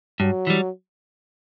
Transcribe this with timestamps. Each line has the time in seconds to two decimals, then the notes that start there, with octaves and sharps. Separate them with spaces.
0.20 G2 F#3
0.47 E3 G3